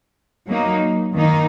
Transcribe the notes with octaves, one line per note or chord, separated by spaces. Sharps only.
F#3 A#3 D#4
D#3 A#3 D#4